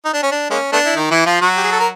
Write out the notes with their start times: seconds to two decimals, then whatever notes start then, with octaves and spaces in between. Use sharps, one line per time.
0.05 D#4
0.14 D4
0.23 C#4
0.31 D4
0.50 G#3 A#3 C#4
0.73 A3 B3 D4
0.85 E4
0.96 D#3 D#4
1.11 E3 E4
1.26 F3 F4
1.41 F#3 F#4
1.57 G4
1.64 G#4
1.72 A4
1.80 A#4